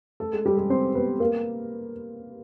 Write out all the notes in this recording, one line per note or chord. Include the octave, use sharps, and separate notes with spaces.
A3 A4
G#3 G#4
G3 G4
G#3 G#4
C4 C5
B3 B4
A#3 A#4